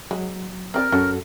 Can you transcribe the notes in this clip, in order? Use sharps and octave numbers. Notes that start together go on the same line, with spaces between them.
F#3 G#3
C4 G4 A#4 D5
F#2 C#4 F#4 A4